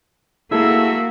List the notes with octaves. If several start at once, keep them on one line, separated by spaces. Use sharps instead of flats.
A#3 E4 F#4 G#4 A4 E5 E6